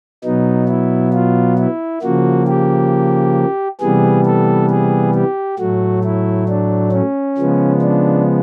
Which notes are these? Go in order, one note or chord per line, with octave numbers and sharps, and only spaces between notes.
B2 F#3 B3 D#4
E4
F4
E4
C#3 F3 A#3 F#4
G4
C3 E3 G3 B3 G#4
A4
G#4
G4
A2 F#3 A3 F#4
E4
D4
C#4
C#3 F3 G#3 B3
D4